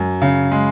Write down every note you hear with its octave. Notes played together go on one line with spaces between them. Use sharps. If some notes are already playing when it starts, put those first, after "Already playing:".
Already playing: F#2
C#3
G#3